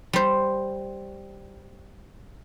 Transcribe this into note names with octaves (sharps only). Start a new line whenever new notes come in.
G3 C5